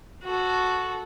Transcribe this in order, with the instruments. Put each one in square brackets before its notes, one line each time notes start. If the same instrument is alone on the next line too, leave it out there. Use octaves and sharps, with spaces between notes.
[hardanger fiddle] F#4 A4